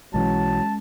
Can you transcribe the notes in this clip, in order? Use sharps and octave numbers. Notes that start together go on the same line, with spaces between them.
B1 E3 F#3 G#3 C#4 A5